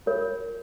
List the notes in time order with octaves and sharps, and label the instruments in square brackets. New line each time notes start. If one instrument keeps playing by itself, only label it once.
[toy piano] F4 A#4 C#5